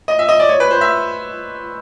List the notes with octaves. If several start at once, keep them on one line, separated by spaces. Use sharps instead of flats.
D#5
E5
D#5
D5
C#5
B4
C5
E5